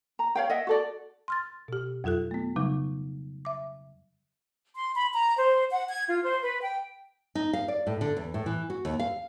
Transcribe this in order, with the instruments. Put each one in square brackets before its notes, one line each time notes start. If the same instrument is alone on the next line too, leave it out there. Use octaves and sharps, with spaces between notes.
[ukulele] A#5
C#5 F5 G5
D#5 E5 F#5
F#4 A4 D5
[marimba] C6 F6 A6
B2 G4
F2 F#3 F4 A4 F#6
A3 B3
C#3 F#3 G3 D#4
E5 D6
[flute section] C6
B5
A#5
C5
F#5
G#6
F4
C5
B4
G5
[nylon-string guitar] D#4
F5
D5
A2
D3
E2
A2
E3
F#4
D#2
F5